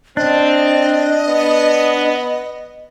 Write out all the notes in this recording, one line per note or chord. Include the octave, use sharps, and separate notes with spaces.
C4 D4 D#5
B3